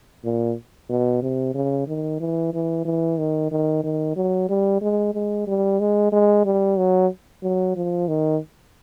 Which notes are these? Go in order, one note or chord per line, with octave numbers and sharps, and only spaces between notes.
A#2
B2
C3
C#3
D#3
E3
E3
E3
D#3
D#3
D#3
F#3
G3
G#3
G#3
G3
G#3
G#3
G3
F#3
F#3
F3
D#3